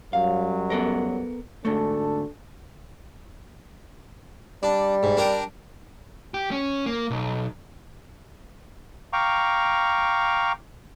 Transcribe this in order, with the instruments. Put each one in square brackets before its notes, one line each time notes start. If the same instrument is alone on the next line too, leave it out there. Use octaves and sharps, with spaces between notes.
[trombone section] F#2 F#3 G3 [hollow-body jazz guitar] F5
[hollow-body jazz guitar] B3 A4 A#4
[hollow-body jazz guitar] D2 G#2 A3 [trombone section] D4 A4
[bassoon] G3 [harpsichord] D4
[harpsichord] G#2
D4 A#4 G5
[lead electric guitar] G4
C#4
A#3
B1
[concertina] F5 G5 A#5 C#6 D6